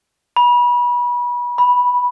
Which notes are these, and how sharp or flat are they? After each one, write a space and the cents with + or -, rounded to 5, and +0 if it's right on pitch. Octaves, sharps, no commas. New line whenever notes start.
B5 -30
B5 -10